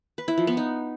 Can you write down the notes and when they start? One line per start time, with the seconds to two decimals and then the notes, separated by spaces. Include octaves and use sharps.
0.18 B4
0.28 E4
0.38 F3
0.47 B3
0.57 D#4